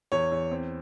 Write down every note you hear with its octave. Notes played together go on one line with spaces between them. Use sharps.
E2 C#5
E2
C4